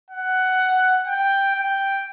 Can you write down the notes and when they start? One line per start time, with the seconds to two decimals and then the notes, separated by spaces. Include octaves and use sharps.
0.11 F#5
1.07 G5
1.55 G5